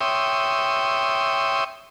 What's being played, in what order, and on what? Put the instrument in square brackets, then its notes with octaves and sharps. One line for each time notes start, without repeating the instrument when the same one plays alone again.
[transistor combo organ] C#5 E5 G5 C6 D#6